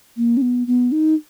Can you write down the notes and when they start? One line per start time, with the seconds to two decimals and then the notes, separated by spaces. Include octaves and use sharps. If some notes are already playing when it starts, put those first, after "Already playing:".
0.17 A#3
0.37 C#4
0.42 B3
0.67 B3
0.92 D#4